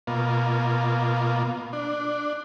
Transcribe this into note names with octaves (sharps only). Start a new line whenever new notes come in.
B2 A#3 F4
D4